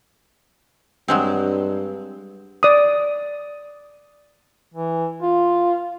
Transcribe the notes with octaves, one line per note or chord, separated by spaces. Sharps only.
G2 F#3 G#3 C4
D5 D#6
E3
F4